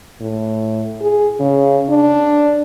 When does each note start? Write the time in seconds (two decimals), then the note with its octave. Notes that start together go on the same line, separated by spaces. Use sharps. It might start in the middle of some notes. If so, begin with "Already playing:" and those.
0.21 A2
1.02 G#4
1.40 C#3
1.89 D4